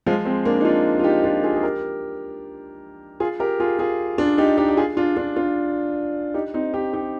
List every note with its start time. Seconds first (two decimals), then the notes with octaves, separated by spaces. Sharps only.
0.06 F3 G#3
0.25 G#3 C4
0.45 A#3 D4
0.61 D#4
0.65 D4 F4
0.99 F4
1.04 D#4 G4
1.24 D4 F4
1.44 F4 G#4
1.56 G#4
1.63 G4 A#4
3.20 F4 G#4
3.40 G4 A#4
3.60 F4 G#4
3.79 F4 G#4
4.18 D4 F4
4.38 D#4 G4
4.58 D#4 G4
4.69 G4
4.77 F4 G#4
4.97 D4 F4
5.17 D4 F4
5.36 D4 F4
6.34 D#4 G4
6.54 C4 D#4
6.74 D#4 G4
6.93 D#4 G4